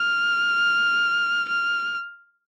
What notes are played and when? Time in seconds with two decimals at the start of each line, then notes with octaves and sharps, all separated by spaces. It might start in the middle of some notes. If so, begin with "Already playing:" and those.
Already playing: F6
1.48 F6